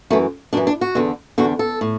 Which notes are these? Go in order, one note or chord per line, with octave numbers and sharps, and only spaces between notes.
F#2 E3 A3
F#2 E3 D4
D4
F#4
E2 D3
E2 D3 F#4
A4
A2